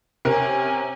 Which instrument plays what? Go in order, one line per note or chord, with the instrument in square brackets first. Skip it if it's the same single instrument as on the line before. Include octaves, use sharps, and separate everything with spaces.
[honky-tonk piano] C3 A#4 [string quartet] C#4 G#5